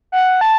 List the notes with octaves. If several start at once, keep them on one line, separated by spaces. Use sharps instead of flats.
F#5
A5